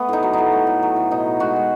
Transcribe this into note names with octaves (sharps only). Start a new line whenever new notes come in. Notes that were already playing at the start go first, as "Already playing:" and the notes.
Already playing: A3 B3
A2 D#4
F#3
A2 D#4
A3
A2
F#3
A2
B2 D#4
B2
G#3 F#4
G#3